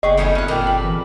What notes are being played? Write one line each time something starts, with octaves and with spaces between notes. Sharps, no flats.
F#1 B3 G4 G#4 D#5 C#6
F2 G3 D#4 E4 G#4
G1 C#4 F#6
A#2 G5 F6
B5
E3